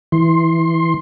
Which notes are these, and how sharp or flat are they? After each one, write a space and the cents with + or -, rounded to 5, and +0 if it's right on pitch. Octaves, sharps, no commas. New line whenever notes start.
E3 -5 C6 +15